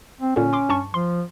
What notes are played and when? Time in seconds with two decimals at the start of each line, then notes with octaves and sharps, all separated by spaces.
0.21 C4
0.36 A#2 D3 C#4
0.53 C6 D6
0.69 G2 A5 C#6
0.94 F3 C6